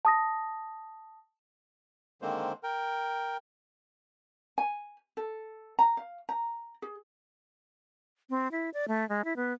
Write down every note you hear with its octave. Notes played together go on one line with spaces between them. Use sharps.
A5 D#6 A#6
D3 D#3 G#3 A#3 C4 C5
A#4 G5
G#5
A4
A#5
F5
A#5
G#4
C4
E4
D5
A3
G#3
E4
B3